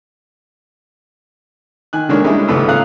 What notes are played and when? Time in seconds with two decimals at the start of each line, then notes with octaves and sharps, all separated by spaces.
1.93 D#3 G#5 F#6
2.09 D3 D#3 G#3 A#3 D4 C#5
2.24 G3 G#3 C#4 D4 E4 G#4
2.48 G#1 C#2 A3 B3 D#6 E6
2.68 C#4 G#4 F5 A#5 F#6